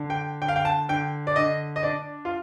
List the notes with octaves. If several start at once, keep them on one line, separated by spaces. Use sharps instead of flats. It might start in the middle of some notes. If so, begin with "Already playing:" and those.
Already playing: D3
G5
D3 G5
F5
G5
A5
D3 G5
D5
D3 D#5
D#5
D4 D5
F4